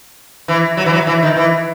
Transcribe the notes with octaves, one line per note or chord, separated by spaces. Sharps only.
E3
F#3
E3
F#3
E3
D#3
E3